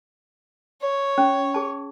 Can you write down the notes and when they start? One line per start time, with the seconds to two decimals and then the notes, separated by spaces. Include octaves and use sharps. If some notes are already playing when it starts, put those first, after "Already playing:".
0.81 C#5
1.18 C#4
1.54 G#4 A5